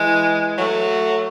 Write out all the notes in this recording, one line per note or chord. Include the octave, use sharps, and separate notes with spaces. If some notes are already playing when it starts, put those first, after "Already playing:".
Already playing: E3 G#3
F#3 A3